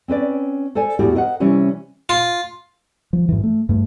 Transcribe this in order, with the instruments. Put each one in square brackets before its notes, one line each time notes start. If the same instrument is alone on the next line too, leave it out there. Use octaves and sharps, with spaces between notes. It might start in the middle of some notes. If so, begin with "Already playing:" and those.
[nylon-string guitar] C4 C#4 B4 D5
A4 C5 D5 G#5
E2 A2 F#4 G4
A#4 C5 D#5 F5 F#5
C3 E3 G3 C#4 C#5
[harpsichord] F4
[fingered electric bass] F3
G#2 E3
A3
G2 A3